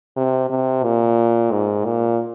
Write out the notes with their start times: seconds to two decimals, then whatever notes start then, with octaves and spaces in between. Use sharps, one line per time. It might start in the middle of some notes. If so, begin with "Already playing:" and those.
0.16 C3
0.50 C3
0.84 A#2
1.51 G#2
1.85 A#2